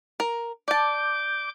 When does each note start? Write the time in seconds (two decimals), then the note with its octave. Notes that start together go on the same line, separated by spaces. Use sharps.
0.20 A#4
0.68 D5 A5 D6 G6